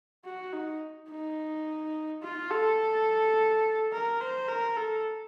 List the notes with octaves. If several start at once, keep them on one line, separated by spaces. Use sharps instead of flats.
F#4
D#4
D#4
F4
A4
A#4
C5
A#4
A4